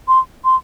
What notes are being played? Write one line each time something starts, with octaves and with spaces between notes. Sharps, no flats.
C6
C6